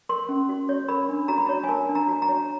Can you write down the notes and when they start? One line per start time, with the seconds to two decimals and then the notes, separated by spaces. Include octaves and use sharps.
0.09 A#4 C6
0.29 C#4
0.49 F#4
0.69 C#5
0.88 A#4 B5
1.09 D4
1.28 F#4 A#5
1.38 B5
1.46 C#5 A#5
1.64 G#5
1.69 A#4 A5
1.89 D4
1.95 A#5
2.08 F#4
2.22 A#5
2.29 C#5